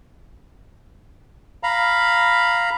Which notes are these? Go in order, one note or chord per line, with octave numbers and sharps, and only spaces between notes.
F5 A#5 B5